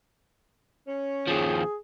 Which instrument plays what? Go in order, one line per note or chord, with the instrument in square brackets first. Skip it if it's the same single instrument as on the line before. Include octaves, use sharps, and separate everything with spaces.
[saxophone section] C#4
[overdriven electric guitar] D#2 F3 [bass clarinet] G#4